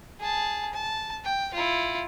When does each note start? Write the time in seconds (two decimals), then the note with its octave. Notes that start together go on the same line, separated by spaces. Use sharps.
0.20 G#4 A5
0.73 A5
1.24 G5
1.54 E4 F4